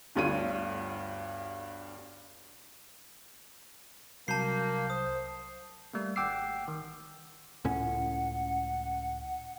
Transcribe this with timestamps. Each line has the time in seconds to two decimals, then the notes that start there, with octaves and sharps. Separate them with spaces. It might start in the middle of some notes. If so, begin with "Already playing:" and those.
0.15 G1 D2 G2 F4 C#5 D#7
4.28 C2 F#3 A#3 A5 G6 C7
4.90 C5 D#6
5.94 G3 A3 A#3
6.16 G#1 F#5 G5 D6 E6 C7
6.68 D#3
7.65 C#2 A2 C#4 F#5